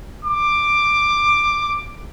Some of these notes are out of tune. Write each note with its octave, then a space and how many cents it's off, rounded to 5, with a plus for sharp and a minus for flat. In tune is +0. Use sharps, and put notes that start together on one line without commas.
D6 +10